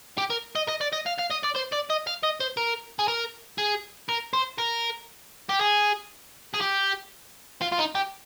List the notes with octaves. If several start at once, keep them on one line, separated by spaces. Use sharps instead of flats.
G4
A#4
D#5
D#5
D5
D#5
F5
F5
D#5
D5
C5
D5
D#5
F5
D#5
C5
A#4
G#4
A#4
G#4
A#4
C5
A#4
G4
G#4
G#4
G4
F4
F4
D#4
G4